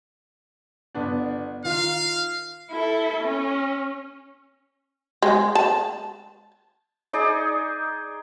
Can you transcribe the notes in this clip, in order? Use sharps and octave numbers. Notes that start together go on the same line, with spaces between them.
G1 B3 D4
D#3 F4 F5
E4 A4
C#4
G#3
A5
D#4 G#4 D5